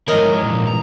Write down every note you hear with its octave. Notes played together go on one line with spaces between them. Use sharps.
G#2 E3 A#4 C#5 D#5 A#5
A#2 F3
A#5